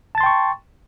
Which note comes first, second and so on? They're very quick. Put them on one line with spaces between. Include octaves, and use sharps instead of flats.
A5 A6 C6 G5 C#6